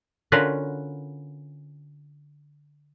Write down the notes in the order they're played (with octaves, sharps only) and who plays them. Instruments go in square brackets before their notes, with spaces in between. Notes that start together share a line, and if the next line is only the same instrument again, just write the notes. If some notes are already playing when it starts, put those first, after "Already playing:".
[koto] D3 C#4 F4 F#4 A#4 B4